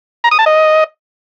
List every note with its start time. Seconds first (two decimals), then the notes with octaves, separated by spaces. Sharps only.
0.24 A#5
0.31 D#6
0.39 A5
0.46 D#5